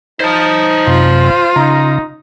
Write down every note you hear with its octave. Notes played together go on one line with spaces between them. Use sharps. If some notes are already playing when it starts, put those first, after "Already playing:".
D#4 C5 A5
F#2 C3 F4
C#3 D#4 A#5